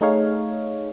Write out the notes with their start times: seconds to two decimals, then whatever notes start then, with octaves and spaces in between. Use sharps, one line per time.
0.01 A3 D#4 G#4 C#5 F5